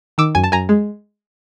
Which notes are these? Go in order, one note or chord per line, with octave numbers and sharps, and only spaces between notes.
D#3 D6 E6
F#2 G#5
A5
F#2 G#5 A#5
G#3